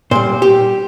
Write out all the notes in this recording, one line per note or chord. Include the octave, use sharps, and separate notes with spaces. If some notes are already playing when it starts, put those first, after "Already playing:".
A#2 G3 C5
G4